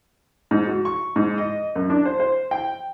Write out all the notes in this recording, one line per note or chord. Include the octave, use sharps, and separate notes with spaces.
G#2
F#4
C#6
G#2
D#5
F#2
D4
C5
C5
G5